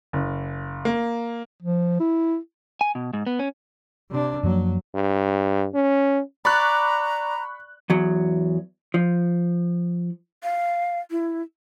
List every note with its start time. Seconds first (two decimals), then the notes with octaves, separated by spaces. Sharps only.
0.13 F#1
0.85 A#3
1.62 F3
2.00 E4
2.81 G#5
2.95 B2
3.13 G#2
3.27 B3
3.39 C#4
4.09 C3 D4
4.43 F#2 F3 F#3 A#3
4.95 G2
5.74 C#4
6.45 D5 A#5 B5 C#6 F#6
7.90 E2 F#3
8.94 F3
10.43 F5
11.11 E4